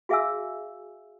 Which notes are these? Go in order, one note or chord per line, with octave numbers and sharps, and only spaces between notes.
F#4 G#4 E5 F5 G#5 E6